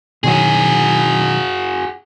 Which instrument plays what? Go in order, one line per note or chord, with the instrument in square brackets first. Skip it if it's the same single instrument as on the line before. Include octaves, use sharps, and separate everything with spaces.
[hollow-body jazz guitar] B2 D#3 F#3 [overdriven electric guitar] F#4 G#4